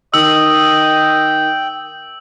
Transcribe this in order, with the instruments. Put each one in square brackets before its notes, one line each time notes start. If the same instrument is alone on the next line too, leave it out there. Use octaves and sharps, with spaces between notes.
[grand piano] D#3 [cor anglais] D#5 [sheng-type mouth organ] G5 [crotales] E6